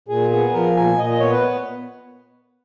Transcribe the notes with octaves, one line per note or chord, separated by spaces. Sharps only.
A#2 G#4
B3 G#4
F3 A#4
A#2 G#5
A#2 D#5
D#5
B3 C#5
B4